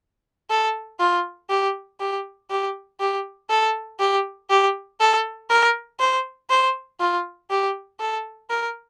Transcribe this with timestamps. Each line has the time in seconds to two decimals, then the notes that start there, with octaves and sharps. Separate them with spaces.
0.50 A4
1.00 F4
1.50 G4
2.00 G4
2.50 G4
3.00 G4
3.50 A4
4.00 G4
4.50 G4
5.00 A4
5.50 A#4
6.00 C5
6.50 C5
7.00 F4
7.50 G4
8.00 A4
8.50 A#4